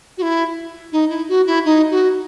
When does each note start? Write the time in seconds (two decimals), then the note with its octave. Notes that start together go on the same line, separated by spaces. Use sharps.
0.17 F#4
0.22 E4
0.92 D#4
1.09 E4
1.28 F#4
1.46 E4
1.65 D#4
1.91 F#4